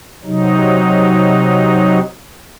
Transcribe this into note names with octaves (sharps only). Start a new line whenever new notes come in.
C3 F#3 D#4